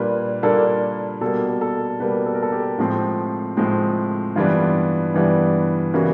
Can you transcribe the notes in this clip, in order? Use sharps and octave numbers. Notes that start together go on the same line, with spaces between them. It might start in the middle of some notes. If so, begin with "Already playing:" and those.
Already playing: A#2 G3 A#3 D4 B4
A#2 G3 A#3 D4 A4
B2 G3 A#3 A4
A4
B2 G3 A#3 B4
A4
A#4
A4
G4
A2 F3 G#3 C4
A2 F3 G#3 C4
G2 E3 G3 B3 D4 F4
G2 E3 G3 B3 D4
C#3 E3 G3 A#3 F#4